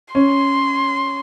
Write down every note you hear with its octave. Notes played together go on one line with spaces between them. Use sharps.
C#4 C6